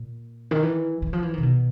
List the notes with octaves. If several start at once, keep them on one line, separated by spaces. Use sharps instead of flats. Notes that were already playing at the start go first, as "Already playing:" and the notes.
Already playing: A#2
D#3
E3
E3
F3
E3
C3 D#3
B2